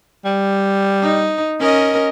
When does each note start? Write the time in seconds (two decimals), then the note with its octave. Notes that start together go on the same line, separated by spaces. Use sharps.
0.25 G3
1.02 D#4
1.59 C#4 A#4 D#5